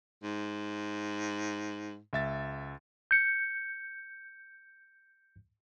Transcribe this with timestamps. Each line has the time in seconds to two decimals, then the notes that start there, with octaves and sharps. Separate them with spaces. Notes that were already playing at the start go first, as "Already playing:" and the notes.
0.23 G#2
2.13 C#2 E5 A6
3.11 G6 C#7